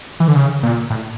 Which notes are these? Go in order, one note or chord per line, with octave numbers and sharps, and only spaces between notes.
E3
D3
C#3
A#2
A2